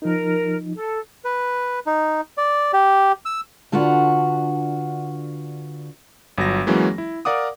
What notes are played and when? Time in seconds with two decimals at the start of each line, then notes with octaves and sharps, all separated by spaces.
0.02 F3 D#4 A#4
0.74 A4
1.25 B4
1.86 D#4
2.38 D5
2.73 G4
3.25 E6
3.72 D3 D4 F4 F#4 B4 F#5
6.38 G1 F#3 A#6
6.67 E3 F#3 G#3 A#3 C#4
6.98 E4
7.25 A#4 D5 F5 F#5 D6 D#6